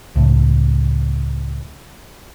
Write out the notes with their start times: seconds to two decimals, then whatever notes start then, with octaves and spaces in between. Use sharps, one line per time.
0.16 C#2 A2